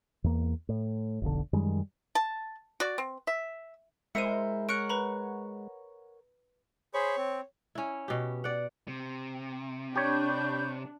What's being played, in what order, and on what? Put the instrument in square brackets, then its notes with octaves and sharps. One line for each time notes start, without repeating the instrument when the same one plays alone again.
[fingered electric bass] E2 A#3
A2
F1 B1 D3
F#2 D#3 G3 G#3
[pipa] A5
F#4 D5
C4
E5
[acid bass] G#3 [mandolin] E4 A#4 C5 [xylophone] C#7 D#7
[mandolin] A#4 C#5 F#5 [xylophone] F#6 C#7 D7
[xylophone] B4 A#5 B5
[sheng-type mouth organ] G#4 C5 B5 [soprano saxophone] C#5
[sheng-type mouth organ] C4
[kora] C#4 E4
B2 G4
D5 F#5
[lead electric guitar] C3
[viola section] D4 [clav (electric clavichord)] G4 C#5 [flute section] B5 C#6 G6